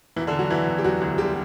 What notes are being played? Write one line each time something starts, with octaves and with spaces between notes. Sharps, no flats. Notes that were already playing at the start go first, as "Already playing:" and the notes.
E1 E3 E4
D3 D4
E1
F#3 F#4
E1 E3 E4
E1
G4
E1 F#3 F#4
D2
D3 G3 G4